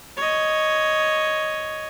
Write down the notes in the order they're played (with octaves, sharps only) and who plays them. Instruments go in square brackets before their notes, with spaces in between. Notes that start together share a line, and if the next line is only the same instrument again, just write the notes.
[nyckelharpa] C#5 D#5